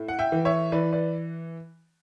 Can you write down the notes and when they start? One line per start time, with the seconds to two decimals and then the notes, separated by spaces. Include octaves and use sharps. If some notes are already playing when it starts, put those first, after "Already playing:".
Already playing: A2
0.08 F#5
0.19 E5 G5
0.32 E3
0.45 C#5 E5
0.72 E3 B4 D5
0.93 B4 D5